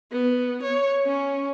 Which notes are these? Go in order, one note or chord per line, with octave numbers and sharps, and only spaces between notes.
B3
C#5
C#4